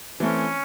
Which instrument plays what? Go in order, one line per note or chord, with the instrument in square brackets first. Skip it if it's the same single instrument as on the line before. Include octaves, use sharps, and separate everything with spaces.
[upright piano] E3 A3 C4 [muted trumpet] C#4